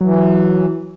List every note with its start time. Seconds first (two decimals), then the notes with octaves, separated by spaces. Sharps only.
0.01 E3 F#3